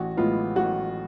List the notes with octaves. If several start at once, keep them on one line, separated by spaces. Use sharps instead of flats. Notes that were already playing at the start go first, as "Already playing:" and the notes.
Already playing: A1 F#4
A2 G#3 B3 F4
A1 F#4